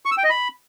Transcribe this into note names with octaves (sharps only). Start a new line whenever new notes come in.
C#6
E6
G5
D#5
B5